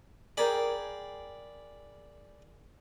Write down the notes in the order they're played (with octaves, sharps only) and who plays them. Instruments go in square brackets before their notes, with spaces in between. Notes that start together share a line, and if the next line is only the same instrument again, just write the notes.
[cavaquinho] G#4 A#4 G5 [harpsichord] D5 B5